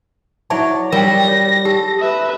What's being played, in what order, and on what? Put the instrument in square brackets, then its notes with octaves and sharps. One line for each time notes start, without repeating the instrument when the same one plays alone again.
[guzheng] F#3 C#5 D5 [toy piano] E4 E5 A5
[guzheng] G3 [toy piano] A#4 G5 [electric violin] A#6
[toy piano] C#5
[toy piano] G4 [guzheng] A4
[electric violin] B4 E5